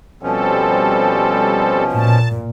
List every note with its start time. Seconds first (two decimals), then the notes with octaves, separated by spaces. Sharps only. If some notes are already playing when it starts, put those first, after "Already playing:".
0.23 B2 F3 G3 C4 C#4 A4
1.95 A#2 A5